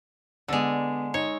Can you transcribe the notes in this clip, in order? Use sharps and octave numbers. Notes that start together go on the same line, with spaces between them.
D3 G#3 B3 D5 E6
D#4 C#5